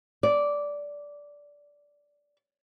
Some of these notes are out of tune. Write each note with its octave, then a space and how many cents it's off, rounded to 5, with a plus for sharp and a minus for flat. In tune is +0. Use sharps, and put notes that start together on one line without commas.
D5 -10